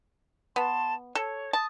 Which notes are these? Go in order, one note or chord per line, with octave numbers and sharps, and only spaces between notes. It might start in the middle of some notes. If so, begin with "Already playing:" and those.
B3 A5 C6
A4 C#5
A5 D#6